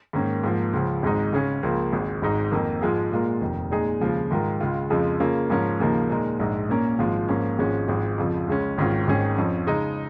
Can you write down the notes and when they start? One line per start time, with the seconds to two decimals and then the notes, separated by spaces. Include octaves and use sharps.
0.13 G#2 D#3 A#3 C#4
0.43 G#2 F3 A#3
0.73 C#2 C#3 F3
1.02 G#1 G#2 G#3 D#4
1.33 C#3 G#3 C#4 G#4
1.63 C#2 C#3 F3 A#3
1.93 G#1 G#2 G#3
2.22 G#1 G#2 G#3 D#4
2.52 F2 D#3 A#3
2.82 G#2 F3 G#3 F4 G#4
3.12 A#2 G#3 F4 A#4
3.41 F1 D#2 D#3
3.71 A#2 G#3 D#4 G#4
4.00 D#2 C#3 F3 G#3 F4
4.31 G#2 D#3 G#3 F4 A#4
4.60 C#2 C#3 G#3 F4
4.90 F2 C#3 F3 G#3
5.20 C#3 A#3 C#4 F4 G#4
5.50 G#2 F3 C#4 A#4
5.80 D#2 C#3 F3 A#3 D#4
6.09 A#2 G#3 D#4 A#4
6.39 A#1 G#2 G#3 D#4
6.69 A#2 A#3 C#4 A#4
6.99 G#1 G#2 F3 G#3 F4
7.28 G#2 F3 A#3 C#4
7.58 G#1 G#2 F3 G#3 C#4
7.88 G#1 G#2 F3 G#3
8.18 F2 C#3 F3
8.47 C#2 C#3 G#3 C#4
8.78 G#1 G#2 D#3 C#4 F4
9.07 G#1 G#2 D#3 C#4 G#4
9.37 F2 F3 C#4
9.67 C#3 G#3 D#4